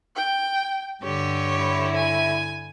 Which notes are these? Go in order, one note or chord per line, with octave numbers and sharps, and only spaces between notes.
G5
G2 D3 G4 C#5
E4
G#5